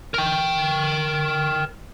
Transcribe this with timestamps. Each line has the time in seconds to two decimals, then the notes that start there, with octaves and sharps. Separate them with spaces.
0.14 A#4 G5